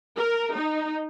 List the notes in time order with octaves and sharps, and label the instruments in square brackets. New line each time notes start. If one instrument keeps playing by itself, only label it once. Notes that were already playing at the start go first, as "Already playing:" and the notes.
[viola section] A#4
D#4